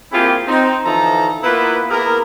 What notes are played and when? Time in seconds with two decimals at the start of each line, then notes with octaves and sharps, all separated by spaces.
0.12 A#3 C4 E4 F4 G4 G#4
0.48 C4 D#4
0.85 D3 E3 F3 D#4 A4 A#5
1.44 A#3 B3 E4 F4 B4
1.90 A#3 B3 E4 G#4 A#4